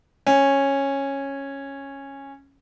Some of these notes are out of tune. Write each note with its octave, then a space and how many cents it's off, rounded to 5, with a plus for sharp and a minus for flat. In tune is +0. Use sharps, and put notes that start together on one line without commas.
C#4 -10